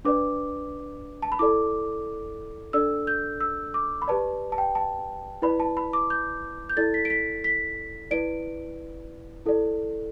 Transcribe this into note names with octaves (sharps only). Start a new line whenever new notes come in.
D4 B4 D5 D6
A5
B5
E4 A4 D5 D6
D4 A4 D5 E6
G6
E6
D6
B5
G4 B4 D5 A5
A5
G5
A5
E4 B4 D5 B5
A5
B5
D6
G6
G6
E4 A4 D5 A6
B6
D7
B6
B6
E4 B4 D5 D7
E4 A4 D5